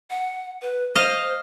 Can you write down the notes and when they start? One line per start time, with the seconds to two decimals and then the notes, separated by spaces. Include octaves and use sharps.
0.10 F#5
0.62 B4
0.95 C5 D#5 F5